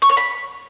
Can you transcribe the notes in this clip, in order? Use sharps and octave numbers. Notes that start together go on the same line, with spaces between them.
C#6
C#5
B5